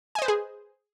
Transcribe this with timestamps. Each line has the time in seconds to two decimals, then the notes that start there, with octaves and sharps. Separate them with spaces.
0.15 G#5
0.19 D#5
0.22 C5
0.25 B4
0.28 G#4